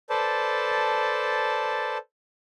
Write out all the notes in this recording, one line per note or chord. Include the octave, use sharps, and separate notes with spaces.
A4 B4 C5 D5 A5